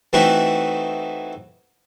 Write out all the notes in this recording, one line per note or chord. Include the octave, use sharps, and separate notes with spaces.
E3 A3 C4 D#4 E4 F#4